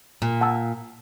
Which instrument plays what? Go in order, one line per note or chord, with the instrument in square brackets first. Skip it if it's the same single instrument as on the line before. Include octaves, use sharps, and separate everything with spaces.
[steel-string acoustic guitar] A#2
[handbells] F#5 A5 E6